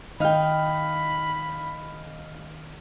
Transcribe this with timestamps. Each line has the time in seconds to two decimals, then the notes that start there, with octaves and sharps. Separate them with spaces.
0.20 D#3 D#4 F5 G5 B5 F6